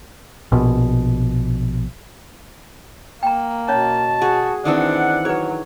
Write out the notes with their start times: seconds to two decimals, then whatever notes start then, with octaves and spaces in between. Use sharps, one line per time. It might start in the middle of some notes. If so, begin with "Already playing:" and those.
0.52 A#1 B2
3.23 A#3 G5 A#5
3.68 B2 C#4 C#5 F5 A5
4.22 F#4 G#4
4.65 D#3 E3 C4 D4 F#5
5.25 F#3 G#4 B4 C#5